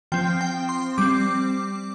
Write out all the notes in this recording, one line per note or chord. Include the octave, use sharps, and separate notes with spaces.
F3 C4 G5
G5
C6
G3 C4 D6